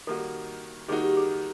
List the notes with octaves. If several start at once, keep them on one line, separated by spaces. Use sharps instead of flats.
D#3 G3 A#3 D#4 F#4 A4
D#3 G3 A#3 D#4 F#4 G#4
G4
G#4